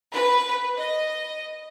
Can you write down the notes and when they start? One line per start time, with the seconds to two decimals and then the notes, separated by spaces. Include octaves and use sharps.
0.13 B4
0.78 D#5